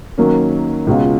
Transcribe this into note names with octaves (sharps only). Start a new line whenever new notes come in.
D#3 F#3 A#3 C#4
C#2 B2 G#3 C#4 F4